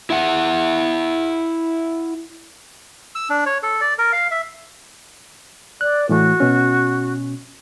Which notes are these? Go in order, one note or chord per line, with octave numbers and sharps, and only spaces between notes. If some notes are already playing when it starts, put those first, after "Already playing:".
E4 E5 F#5
E6
D4
C#5
A4
D5
A#4
F5
E5
D5 F#6
A2 E3 A3 F#4
B2 C#4